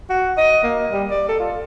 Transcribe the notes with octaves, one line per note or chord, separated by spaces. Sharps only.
F#4
D#5
A#3
G3
D5
A4
F4